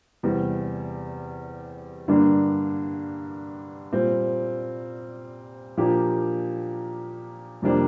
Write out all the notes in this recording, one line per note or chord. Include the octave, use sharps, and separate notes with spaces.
E2 C3 G3
G2 D3 G3 A#3 D4
A#2 G3 C4
A#2 F3 A#3 D4 G4
F2 C3 G3 A#3 D4